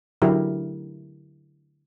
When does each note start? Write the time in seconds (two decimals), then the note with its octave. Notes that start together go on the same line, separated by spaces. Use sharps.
0.22 D3 F#3 E4 G4 A#4